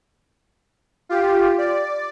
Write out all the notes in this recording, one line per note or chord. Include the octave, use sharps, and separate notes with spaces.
F4 G4
D5